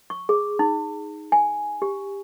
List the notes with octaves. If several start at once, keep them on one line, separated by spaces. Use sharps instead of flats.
C#6
G#4
D#4
G#5
G4